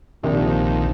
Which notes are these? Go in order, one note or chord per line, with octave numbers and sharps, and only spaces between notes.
A#1 D#2 C3 F3